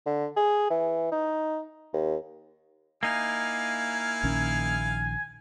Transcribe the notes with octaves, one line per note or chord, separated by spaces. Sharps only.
D3
G#4
E3
D#4
D#2
A#3 D#4 E4 F5 G#5 F6
A#1 D#3 C#4